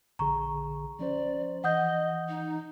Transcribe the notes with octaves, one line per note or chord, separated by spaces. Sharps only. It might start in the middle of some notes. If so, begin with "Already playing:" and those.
A#1 D3 G#4 A#5 C#6
F3 C#4 C5 D5
E3 D#5 F#5 D#6 G6
D#4